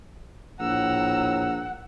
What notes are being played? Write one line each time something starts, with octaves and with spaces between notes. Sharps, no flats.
A#1 A2 F#5 A#5 E6